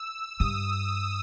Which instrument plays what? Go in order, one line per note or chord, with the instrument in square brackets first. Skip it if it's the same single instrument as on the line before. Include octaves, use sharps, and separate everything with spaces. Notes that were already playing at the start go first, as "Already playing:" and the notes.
Already playing: [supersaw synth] E6
[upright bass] G2 [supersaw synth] D#6